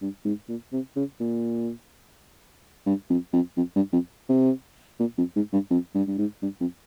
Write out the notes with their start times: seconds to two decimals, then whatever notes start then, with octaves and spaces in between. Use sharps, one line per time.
0.01 G2
0.25 G#2
0.49 A#2
0.72 C3
0.96 C#3
1.20 A#2
2.86 G2
3.10 F2
3.33 F2
3.57 F2
3.75 G2
3.93 F2
4.29 C3
4.99 A#2
5.18 F2
5.36 G#2
5.53 G2
5.70 F2
5.95 G2
6.07 G2
6.18 G#2
6.42 G2
6.60 F2